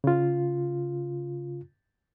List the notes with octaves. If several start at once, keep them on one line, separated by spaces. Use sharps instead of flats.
C#3 F4